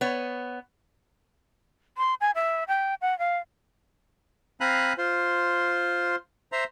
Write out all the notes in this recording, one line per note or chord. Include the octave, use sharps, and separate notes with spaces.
B3 C#5
C6
G#5
E5
G5
F#5
F5
C4 F5 G#5 A#5 B5 F#6
F4 C5
C5 E5 A#5